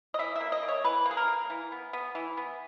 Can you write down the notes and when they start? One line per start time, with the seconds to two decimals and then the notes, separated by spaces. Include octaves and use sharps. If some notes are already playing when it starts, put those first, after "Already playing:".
0.14 D#5
0.19 E3 E5
0.35 A#3 E5
0.52 D#5
0.63 A#3
0.68 C#5
0.85 E3 B4
1.06 A#3
1.11 G#4
1.17 A#4
1.28 A#3
1.50 E3
1.72 B3
1.93 B3
2.15 E3
2.37 B3